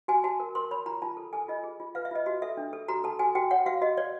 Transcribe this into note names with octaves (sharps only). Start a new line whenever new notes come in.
F#4 G#5
F#4 A5
A#4
A#4 C6
C#5 B5
F4 A#5
F4 A5
A4
A4 G#5
F4 D#5
G#4
F4
B4 F5
E5
F4 D#5
F#4 D#5
A4 E5
D4
A4
F#4 A#5
A4 A5
F#4 G#5
F#4 G5
C#5 F#5
F#4 F5
F#4 D#5
C#5 D5